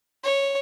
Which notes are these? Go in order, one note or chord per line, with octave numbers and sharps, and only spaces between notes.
C#5